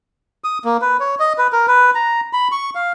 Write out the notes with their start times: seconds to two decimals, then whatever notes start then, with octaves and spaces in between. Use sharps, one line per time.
0.44 D#6
0.65 A#3
0.81 B4
1.00 C#5
1.20 D#5
1.38 B4
1.53 A#4
1.68 B4
1.95 A#5
2.33 B5
2.52 C#6
2.75 F5